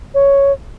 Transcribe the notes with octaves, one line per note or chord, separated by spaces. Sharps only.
C#5